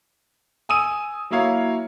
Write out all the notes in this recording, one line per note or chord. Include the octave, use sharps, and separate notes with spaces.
G#5 D#6 E6 D#7
F#3 A#3 E4 C#5 F5